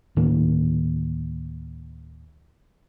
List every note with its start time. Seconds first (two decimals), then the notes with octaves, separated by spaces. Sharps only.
0.16 D2 A2 D#3 A#3